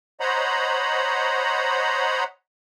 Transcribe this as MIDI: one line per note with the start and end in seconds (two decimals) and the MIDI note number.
0.20 2.24 72
0.20 2.24 73
0.20 2.24 75
0.20 2.24 78
0.20 2.24 82
0.20 2.24 83